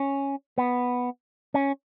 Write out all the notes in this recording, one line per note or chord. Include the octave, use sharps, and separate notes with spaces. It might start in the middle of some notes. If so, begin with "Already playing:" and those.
Already playing: C#4
B3
C#4